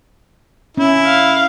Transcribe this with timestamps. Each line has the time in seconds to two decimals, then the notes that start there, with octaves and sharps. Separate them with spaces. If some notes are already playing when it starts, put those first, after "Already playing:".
0.77 C#4 E4
1.06 F5